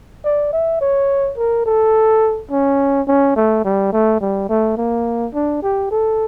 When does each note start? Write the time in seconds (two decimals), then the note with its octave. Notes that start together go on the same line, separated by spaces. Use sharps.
0.25 D5
0.53 E5
0.81 C#5
1.38 A#4
1.66 A4
2.51 C#4
3.08 C#4
3.36 A3
3.65 G3
3.93 A3
4.21 G3
4.49 A3
4.77 A#3
5.35 D4
5.63 G4
5.91 A4